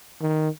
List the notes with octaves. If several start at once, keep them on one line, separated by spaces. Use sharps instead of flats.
D#3